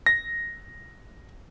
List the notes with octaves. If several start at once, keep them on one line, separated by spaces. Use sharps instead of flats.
A#6